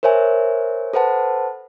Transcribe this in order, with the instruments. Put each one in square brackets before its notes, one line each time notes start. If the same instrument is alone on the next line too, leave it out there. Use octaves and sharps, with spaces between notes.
[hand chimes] A#4 C5 C#5 E5 G#5
A4 B4 C5 F#5 A5